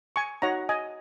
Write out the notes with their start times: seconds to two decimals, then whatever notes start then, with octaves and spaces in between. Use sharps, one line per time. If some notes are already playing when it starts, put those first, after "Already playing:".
0.16 G#5 C#6
0.42 D#4 F#4 C#5 F#5 A#5
0.69 D#5 G#5